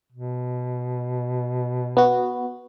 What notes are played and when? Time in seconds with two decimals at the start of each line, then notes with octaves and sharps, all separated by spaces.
0.12 B2
1.97 B3 F#4